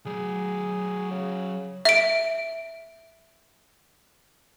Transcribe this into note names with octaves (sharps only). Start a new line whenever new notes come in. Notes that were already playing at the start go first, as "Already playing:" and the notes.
F#3 G#4 D5
C#3
E5 D7